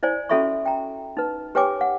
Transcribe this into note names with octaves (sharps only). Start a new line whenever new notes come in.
E4 C5 D5 G#5
C#4 F#4 A4 E5 B5 C#6
G5 A#5
D#4 B4
G4 B4 C#5 G5 G#5 D6
F#5